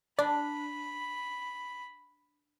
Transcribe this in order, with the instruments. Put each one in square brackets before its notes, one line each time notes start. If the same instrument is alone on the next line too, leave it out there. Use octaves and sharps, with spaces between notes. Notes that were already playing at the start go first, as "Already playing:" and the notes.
[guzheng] D4 [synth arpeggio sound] D5 [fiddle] B5